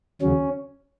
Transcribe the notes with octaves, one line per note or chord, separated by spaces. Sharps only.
D#2 C#3 F#3 C#4